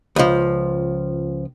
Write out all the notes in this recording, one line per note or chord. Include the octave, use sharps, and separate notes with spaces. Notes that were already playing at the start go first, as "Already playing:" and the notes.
C#2 F3